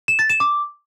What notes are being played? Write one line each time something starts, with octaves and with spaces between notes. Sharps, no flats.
E7
A6
E7
D6